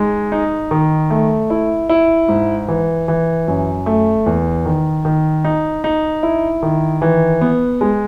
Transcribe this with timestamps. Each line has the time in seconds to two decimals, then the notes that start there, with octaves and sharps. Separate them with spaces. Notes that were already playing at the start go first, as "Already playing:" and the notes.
Already playing: G#3 D#4
0.32 D#4
0.71 D#3
1.10 A3
1.50 E4
1.89 E4
2.29 G#2
2.68 E3
3.08 E3
3.48 F#2
3.86 A3
4.26 E2
4.65 D#3
5.05 D#3
5.44 D#4
5.84 D#4
6.23 E4
6.63 D#3
7.02 E3
7.41 B3
7.81 G#3